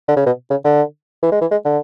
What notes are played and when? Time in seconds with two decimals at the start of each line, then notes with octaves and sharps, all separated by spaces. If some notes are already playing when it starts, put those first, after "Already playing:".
0.08 D3
0.16 C#3
0.26 B2
0.50 C#3
0.65 D3
1.23 E3
1.32 G#3
1.41 E3
1.51 G#3
1.65 D3